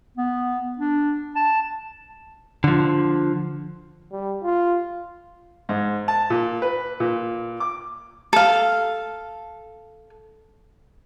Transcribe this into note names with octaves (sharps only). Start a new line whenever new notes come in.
B3
D4
A5
D3 F3
G3
F4
G#2
A5
A#2
B4
A#2
D6
A4 F5